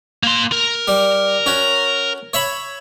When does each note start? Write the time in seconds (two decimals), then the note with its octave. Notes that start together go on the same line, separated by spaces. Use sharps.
0.23 A#3 C6
0.52 A#4
0.88 G3
1.46 C#4 F#4
2.33 C#5 E5 B5